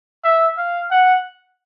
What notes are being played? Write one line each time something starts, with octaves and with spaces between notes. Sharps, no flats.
E5
F5
F#5